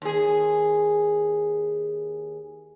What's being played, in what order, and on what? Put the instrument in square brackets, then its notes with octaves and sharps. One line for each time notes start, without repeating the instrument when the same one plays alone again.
[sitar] D#2 G#4